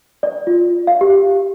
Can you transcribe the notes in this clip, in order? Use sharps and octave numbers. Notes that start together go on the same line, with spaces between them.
D5
F4
F5
G4